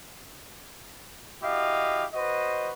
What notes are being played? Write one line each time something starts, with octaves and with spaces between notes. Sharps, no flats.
E4 F#4 G4 D#5 F5
F#4 B4 C5 D#5